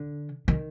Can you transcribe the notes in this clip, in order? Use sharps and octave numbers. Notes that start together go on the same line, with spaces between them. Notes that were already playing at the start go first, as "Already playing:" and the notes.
Already playing: D3
D#3